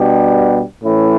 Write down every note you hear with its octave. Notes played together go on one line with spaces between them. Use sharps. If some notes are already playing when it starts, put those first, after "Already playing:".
Already playing: B2 G3 B3 D4 G4
A2 E3 A3 C#4 E4